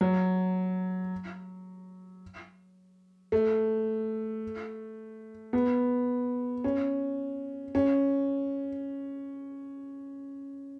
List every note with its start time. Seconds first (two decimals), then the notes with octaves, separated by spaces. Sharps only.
0.01 F#3
3.32 A3
5.53 B3
6.64 C#4
7.75 C#4